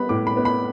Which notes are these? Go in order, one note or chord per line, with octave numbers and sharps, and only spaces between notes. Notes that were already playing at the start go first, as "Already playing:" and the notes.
Already playing: G3 B3 B5
A2 D6
B5
B3
B5